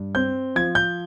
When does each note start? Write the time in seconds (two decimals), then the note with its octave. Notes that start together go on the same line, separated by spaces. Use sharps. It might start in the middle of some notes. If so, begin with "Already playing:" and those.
Already playing: G2
0.15 C4 G6
0.56 F3 G#6
0.75 G6